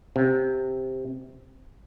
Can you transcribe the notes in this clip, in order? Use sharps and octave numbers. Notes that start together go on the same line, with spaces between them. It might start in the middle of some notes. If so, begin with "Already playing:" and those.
C3